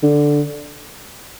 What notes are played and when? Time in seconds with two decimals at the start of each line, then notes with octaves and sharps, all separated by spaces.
0.03 D3